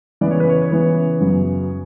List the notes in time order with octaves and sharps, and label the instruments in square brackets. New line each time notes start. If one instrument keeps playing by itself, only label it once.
[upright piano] C#3 E3 B3 D5
C#5
B4
C#5
C#3 E3 B3
F#2 C#3 F#3 B3